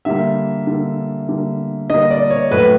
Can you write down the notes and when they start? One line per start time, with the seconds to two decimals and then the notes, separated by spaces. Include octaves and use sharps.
0.05 D3 G3 A#3 E5
0.67 D3 G3 A#3
1.28 D3 G3 A#3
1.90 D3 G3 A#3 D#5
2.11 D5
2.31 C#5
2.51 A2 F#3 A3 B4